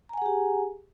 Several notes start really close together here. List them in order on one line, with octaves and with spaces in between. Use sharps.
A#5 G#5 F#5 G#4 G4